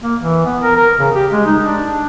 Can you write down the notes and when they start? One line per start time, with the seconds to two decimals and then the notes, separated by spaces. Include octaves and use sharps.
0.03 A#3
0.20 E3
0.46 B3
0.62 A#4
0.76 A#4
0.99 C#3
1.15 G4
1.32 G#3
1.46 D#4
1.62 D4